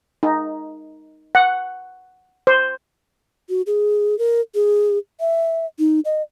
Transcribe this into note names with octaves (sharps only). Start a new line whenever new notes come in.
D#4
F#5
C5
F#4
G#4
A#4
G#4
E5
D#4
D#5